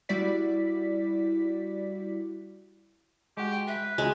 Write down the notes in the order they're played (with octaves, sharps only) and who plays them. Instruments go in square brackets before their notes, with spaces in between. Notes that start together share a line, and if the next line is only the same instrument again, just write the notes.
[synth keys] G3 E4 F#4 D5 B6
[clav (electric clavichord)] G#3 F#4 [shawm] G4
[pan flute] G5
[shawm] B4 [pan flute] E5
[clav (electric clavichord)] C#2 [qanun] G#3 [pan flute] F#4